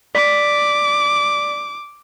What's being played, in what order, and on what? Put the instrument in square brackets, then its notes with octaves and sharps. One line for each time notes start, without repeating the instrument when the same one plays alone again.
[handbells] D5 B6 [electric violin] D6